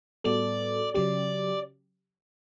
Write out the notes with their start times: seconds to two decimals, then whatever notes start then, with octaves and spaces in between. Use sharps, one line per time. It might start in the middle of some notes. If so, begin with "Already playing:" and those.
0.24 A2 G3 B3 F#4 A4 D5
0.94 C#3 F#3 C#4 G4 D5